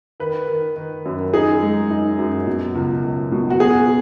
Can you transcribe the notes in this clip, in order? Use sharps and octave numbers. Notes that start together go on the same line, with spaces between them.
D#3 B4
D#3
D#3
F#2
D#4 G#4
G#3
D#4
F#2
B2
C#2
C#2
B2
F#4
B3 G#4